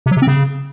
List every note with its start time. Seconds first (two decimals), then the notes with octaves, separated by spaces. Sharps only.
0.06 C3
0.11 F#3
0.17 C3
0.22 C4
0.27 C#3